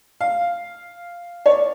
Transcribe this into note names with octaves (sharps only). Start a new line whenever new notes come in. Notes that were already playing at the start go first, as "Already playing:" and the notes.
F5
C#5
D5